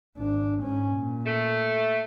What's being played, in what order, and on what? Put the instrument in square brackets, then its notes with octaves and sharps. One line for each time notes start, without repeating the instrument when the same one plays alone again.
[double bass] G#1 D4
G#2 C#4
A#2
[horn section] A3